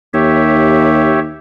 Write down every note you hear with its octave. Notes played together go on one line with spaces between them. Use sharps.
D#2 G4 C#5 E5